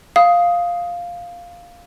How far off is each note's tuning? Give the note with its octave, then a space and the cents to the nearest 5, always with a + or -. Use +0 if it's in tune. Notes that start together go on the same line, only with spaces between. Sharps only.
F5 +0 D#6 +10